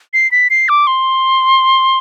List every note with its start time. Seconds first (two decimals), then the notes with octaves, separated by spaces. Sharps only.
0.14 C7
0.32 B6
0.50 C7
0.69 D6
0.87 C6